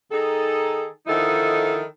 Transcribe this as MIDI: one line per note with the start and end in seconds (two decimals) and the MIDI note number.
0.11 0.85 51
0.11 0.85 63
0.11 0.85 68
0.11 0.85 69
1.07 1.82 50
1.07 1.82 51
1.07 1.82 53
1.07 1.82 63
1.07 1.82 64
1.07 1.82 69